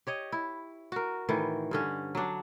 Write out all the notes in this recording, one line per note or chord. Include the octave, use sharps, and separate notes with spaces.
G4 C#5 D#5
E4
F#4 A#4
A2 D#3 E3
G2 D3 C#4
F#3 D4